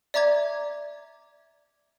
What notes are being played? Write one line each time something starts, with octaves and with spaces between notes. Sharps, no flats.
D5 E5 A#5 D6 G#6